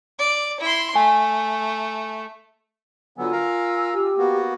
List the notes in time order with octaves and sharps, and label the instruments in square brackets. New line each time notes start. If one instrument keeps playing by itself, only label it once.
[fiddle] D5
E4 C6
[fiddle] A3 [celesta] G#5
[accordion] D3 F#3 B3 [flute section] F4 G#5 E6
[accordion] A#4 F5 A#5
[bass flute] G4
[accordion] A#3 B3 F#4